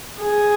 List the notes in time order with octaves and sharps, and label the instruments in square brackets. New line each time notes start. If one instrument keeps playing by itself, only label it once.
[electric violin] G#4